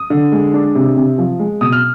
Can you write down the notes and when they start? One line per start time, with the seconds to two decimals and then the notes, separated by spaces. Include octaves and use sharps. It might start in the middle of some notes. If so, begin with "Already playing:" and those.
Already playing: D#6
0.10 D3
0.32 G#3
0.54 D4
0.75 C3
0.96 C3
1.18 F3
1.39 G#3
1.61 B2 D#6
1.72 F6